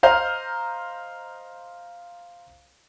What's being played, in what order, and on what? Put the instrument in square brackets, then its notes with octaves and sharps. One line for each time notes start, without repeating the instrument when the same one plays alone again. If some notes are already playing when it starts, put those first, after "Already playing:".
[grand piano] C5 D#5 F5 A#5 F6 G6